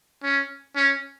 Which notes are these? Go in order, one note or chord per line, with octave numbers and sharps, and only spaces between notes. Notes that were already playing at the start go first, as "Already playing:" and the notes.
C#4
C#4